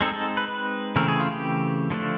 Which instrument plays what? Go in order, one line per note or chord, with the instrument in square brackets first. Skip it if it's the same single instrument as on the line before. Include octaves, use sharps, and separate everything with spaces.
[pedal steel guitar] G#3 C4 D#4 A4
A4
B4
B4
C#3 E3 A3 C4 A#4
G#4
F4
G4
D3 F3 A3 D4